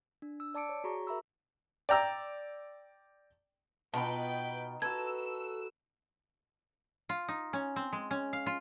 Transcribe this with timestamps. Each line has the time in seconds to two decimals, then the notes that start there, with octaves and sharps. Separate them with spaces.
0.22 D4
0.40 E6
0.54 D5 A5 D6 C#7 D7
0.69 C#5
0.84 F#4 G#4 A#5 C#6
1.07 A#4 E5 A#5 B5 E6
1.89 D5 G5 A#5 E6
3.94 B2 D#4 F4 B4 G5 A5 B5
4.82 F#4 A4 B4 E6 G#6
7.09 F4
7.28 D#4
7.53 C#4
7.76 C4
7.93 G#3
8.11 C#4
8.33 F5
8.46 F4